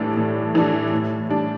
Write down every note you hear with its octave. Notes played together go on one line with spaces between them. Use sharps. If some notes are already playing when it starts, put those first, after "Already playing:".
Already playing: A2 E3 G3 D4 A4
A2
E3 G3 D4 A4
A2
G3 D4